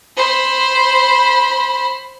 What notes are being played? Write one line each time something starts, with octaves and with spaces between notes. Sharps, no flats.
C5 B5